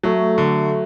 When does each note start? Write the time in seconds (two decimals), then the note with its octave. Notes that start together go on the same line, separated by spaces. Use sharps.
0.03 F#3 A3
0.38 D3